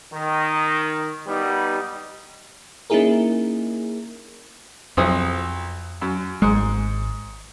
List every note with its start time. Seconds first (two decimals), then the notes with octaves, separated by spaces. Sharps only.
0.11 D#3
1.26 G3 B3 D#4
2.90 A#3 C#4 D#4 E4 G#4 A#4
4.97 B1 F2 C4 D#6
6.01 F#2
6.42 G#1 G#2 G#3